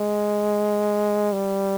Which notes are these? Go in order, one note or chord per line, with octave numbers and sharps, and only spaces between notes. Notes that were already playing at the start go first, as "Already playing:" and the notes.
Already playing: G#3
G3